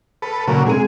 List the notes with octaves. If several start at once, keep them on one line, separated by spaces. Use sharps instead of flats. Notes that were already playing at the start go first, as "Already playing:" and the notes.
A4 B4
A#2 C#3 F#3
C3 G#3 A4 D#7